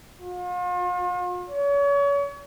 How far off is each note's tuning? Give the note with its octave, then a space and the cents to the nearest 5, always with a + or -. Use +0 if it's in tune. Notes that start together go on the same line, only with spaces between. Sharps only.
F4 +45
C#5 +35